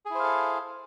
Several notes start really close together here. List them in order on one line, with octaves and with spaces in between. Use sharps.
G#4 E4 C5 F5 A4